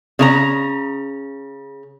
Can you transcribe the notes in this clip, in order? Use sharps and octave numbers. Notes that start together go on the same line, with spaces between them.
C#3 D#4 A#5